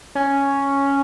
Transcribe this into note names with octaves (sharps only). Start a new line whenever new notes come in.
C#4